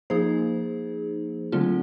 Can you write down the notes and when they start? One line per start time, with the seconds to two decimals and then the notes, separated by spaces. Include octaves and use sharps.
0.10 F3 A#3 D#4 G#4 C5
1.52 D3 F#3 A3 C4 F4